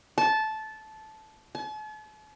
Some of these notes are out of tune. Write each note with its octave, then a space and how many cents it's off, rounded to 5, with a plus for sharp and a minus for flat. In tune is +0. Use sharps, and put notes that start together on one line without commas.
A5 -15
A5 -45